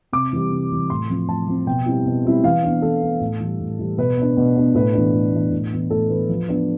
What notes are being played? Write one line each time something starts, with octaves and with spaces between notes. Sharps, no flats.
C3 D6
E3 G3
C3
E3 G3
A2 C6
F3 C4
A2 A5
F3 C4
B2 G5
G3 C4 E4
B2
G3 C4 E4
E3 F5
B3 D4
E3 A4
B3 D4
A2
E3 G3
A2
E3 G3
B2 B4
B3 D4
B2
B3 D4
A2 B4
E3 B3 D4
A2
E3 B3 D4
A2
E3 B3
A2 A4
E3 B3 B4
F3
B3 D4